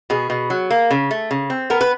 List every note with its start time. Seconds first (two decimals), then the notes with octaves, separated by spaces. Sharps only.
0.10 B2 G#4
0.30 B2
0.50 F#3
0.71 A#3
0.91 C#3
1.11 A3
1.31 C#3
1.50 C4
1.70 B3 A#4
1.81 B4